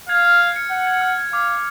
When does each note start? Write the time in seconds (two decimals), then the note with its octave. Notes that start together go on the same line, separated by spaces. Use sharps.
0.09 F5 G#6
0.25 F6
0.41 F6
0.56 C#7
0.71 F#5 C#7
0.87 G#6
1.01 F6
1.18 G#6
1.33 F5 D6
1.49 D6